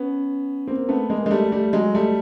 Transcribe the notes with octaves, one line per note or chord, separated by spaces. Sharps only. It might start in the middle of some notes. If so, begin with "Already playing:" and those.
Already playing: B3 C#4
A#3 C4
A3 B3
G#3 A#3
G#3
G3 A3
G3 A3
F#3 G#3
G3 A3